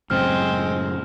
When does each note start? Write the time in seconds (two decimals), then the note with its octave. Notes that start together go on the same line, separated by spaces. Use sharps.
0.10 F#2 A2 C#3 G#3 C4 F6